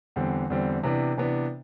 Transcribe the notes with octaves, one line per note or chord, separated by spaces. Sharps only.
E2 D3 G3 C4
E2 D3 G3 C4
C3 E3 B3 D4
C3 E3 B3 D4